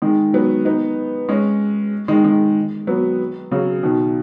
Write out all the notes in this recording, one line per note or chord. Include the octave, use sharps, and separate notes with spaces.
D#3 G#3
F#3 B3
B3 D#4
G#3 C#4
D#3 G#3
D#3 G#3
F#3 B3
C#3 F#3
B2 D#3